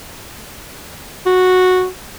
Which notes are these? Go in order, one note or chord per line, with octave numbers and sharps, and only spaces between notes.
F#4